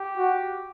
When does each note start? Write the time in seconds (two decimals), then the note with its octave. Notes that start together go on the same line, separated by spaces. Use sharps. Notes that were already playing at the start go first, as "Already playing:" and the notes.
Already playing: G4
0.17 F#4